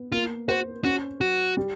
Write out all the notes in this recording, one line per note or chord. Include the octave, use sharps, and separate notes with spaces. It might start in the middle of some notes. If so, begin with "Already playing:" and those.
Already playing: B3
A#3 F4
F#4 C5
C#4 F#4
F#3 F#4
G3